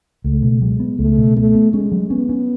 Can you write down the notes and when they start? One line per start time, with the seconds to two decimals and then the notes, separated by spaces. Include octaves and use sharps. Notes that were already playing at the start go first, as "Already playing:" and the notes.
0.24 C#2 A3
0.43 B2
0.61 F#3 G#3
0.80 B3
0.98 C#2 A3
1.18 B2
1.36 A3 B3
1.55 B3
1.73 G#3 C#4
1.92 F#3
2.10 B3 C#4
2.29 C#4